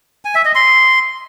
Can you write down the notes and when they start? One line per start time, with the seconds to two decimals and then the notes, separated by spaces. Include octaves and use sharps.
0.25 G#5
0.35 E5
0.45 D#5
0.55 C6